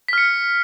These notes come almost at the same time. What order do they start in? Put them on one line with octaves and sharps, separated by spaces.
B6 F6 C#7